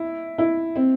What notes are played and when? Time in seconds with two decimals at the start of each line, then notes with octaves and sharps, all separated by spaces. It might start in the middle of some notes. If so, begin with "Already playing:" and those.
Already playing: E4
0.38 E4
0.76 C4